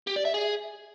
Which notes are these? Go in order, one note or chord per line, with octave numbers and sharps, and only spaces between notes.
G4
D5
E5
G#4